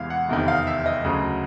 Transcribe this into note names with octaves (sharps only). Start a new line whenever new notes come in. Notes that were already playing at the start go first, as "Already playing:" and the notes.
Already playing: E2 C3 E3 G#3 F5
F#5
F1 E2 C3 D#3
F5
E5
D#5
D2 C#3 F#3